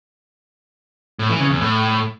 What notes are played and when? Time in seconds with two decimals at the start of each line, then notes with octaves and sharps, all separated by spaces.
1.19 A2
1.30 E3
1.40 C#3
1.51 E2
1.61 A2